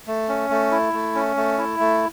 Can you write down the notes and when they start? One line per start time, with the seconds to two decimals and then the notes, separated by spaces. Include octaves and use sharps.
0.07 A3
0.28 C#4
0.50 A3
0.71 E4
0.93 A3
1.15 C#4
1.36 A3
1.58 E4
1.79 A3